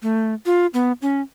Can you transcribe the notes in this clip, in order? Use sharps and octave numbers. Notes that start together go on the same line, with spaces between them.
A3
F4
B3
C#4